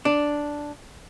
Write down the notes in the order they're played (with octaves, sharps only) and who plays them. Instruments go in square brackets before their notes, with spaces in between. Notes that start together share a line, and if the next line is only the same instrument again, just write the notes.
[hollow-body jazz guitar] D4